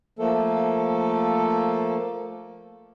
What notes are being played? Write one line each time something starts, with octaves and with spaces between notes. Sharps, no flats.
F3 A3 A#3 A4